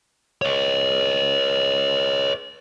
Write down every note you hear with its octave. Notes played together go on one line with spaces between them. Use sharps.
C#5 D#5